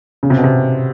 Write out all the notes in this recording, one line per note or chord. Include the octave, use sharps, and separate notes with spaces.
C#3
C3
B2
C3